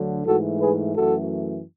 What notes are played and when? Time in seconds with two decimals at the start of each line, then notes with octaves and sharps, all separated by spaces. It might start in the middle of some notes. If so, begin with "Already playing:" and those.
Already playing: D2 D3 F#3
0.26 G#2 E3 A3 F#4 A4
0.60 G#4 B4
0.95 F#2 E3 A3 F#4 A4